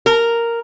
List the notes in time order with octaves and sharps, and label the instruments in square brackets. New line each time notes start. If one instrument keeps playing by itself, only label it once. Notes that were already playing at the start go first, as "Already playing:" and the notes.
[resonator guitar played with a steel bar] A#4